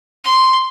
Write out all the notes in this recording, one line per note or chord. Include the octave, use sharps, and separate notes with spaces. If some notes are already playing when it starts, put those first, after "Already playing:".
C6